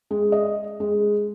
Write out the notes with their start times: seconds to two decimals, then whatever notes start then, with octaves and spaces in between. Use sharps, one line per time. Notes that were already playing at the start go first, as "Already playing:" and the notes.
0.11 G#3
0.32 D#5
0.80 G#3